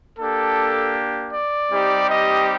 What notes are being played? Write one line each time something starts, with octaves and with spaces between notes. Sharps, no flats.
A#3 D4 G4 A4
D5
G3 C4 D#4 G4
D#5